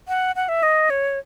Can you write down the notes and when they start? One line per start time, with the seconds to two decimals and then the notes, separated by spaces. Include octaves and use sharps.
0.08 F#5
0.36 F#5
0.49 E5
0.63 D#5
0.90 C#5